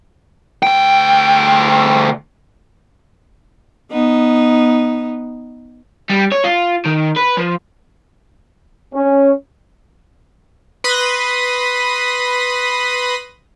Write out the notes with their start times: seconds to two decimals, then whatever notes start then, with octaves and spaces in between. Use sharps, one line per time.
0.63 D2 G5
3.91 B3 D#4
6.10 G3
6.32 C#5
6.44 F4
6.86 D#3
7.17 B4
7.37 F3
8.94 C#4
10.84 B4 B5 C6 D#6 A#6